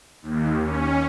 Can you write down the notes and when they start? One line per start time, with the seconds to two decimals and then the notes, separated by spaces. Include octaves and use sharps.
0.22 D#2
0.61 C#4